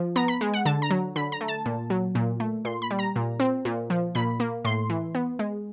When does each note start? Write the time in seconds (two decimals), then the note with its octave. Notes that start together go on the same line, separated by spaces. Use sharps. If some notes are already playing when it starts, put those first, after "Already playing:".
Already playing: F3
0.16 B3 A#5
0.28 B5
0.41 G#3
0.54 F#5
0.65 D3 A5
0.82 A#5
0.91 F#3
1.16 D3 B5
1.32 A#5
1.41 A3
1.48 A5
1.66 A#2
1.90 F#3
2.15 A#2
2.40 A3
2.65 A#2 C6
2.82 B5
2.91 G3
2.99 A#5
3.16 A#2
3.40 C4
3.65 A#2
3.90 F3
4.15 A#2 B5
4.40 A#3
4.65 A2 C6
4.90 E3
5.15 B3
5.39 G#3